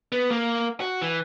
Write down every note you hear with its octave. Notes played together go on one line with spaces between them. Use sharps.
B3
A#3
F#4
E3